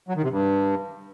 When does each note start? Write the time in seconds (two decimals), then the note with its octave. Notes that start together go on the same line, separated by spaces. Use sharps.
0.09 F#3
0.16 D#3
0.23 C3
0.31 G2